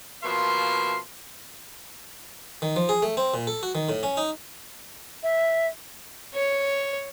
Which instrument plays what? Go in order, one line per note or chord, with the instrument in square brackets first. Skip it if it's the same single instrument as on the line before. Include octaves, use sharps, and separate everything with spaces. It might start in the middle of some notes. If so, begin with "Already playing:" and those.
[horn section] B2 F3 A#3 E5 C6
[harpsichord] D#3
F3
G#4
A3
C4
A#2
A4
F#4
D#3
A2
C#4
D#4
[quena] E5
[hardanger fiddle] C#5